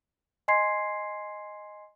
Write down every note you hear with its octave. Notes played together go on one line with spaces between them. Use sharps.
D#5 G#5 C6 G#6 C7